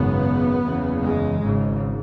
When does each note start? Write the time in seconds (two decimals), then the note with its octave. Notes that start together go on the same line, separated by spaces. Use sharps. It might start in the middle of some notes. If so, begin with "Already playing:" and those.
Already playing: G#1 F#2 C#3 B3
0.64 F#1 E2 C#3
1.03 G#3
1.44 G#1 G#2 C#3